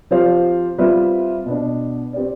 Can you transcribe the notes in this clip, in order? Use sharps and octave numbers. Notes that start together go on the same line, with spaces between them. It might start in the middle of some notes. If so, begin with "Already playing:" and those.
F3 C4 G4 C5 F5
G3 C4 F4 B4 E5
B2 B3 D4
C4 G4 B4 D5